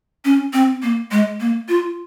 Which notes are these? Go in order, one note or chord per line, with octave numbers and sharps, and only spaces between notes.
C#4
C4
A#3
G#3
A#3
F4